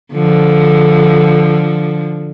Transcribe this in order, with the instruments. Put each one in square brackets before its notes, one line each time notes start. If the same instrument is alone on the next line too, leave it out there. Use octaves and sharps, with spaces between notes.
[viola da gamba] D3 F3